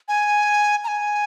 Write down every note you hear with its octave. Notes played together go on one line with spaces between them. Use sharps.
G#5
A#5
G#5